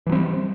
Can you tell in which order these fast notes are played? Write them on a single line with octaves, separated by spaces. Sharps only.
E3 F#3 C4 G3